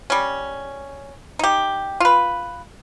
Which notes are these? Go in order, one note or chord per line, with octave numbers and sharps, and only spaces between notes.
G3 C#4
D#4 G4
F4 B4